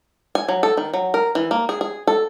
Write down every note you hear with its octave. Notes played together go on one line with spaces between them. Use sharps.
G#5
F#3
A4
D#3
F#3
A#4
E3
A#3
G#4
G#4
A4